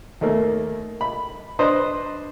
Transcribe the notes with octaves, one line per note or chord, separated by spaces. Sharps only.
D#2 A3 A#3
B5
D4 B4 C5 D#5